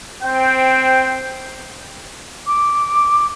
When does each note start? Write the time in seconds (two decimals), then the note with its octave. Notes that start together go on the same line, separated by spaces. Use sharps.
0.22 C4 C5 G5
2.46 D6